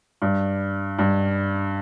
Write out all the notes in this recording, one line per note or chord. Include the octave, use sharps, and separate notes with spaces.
G2
G2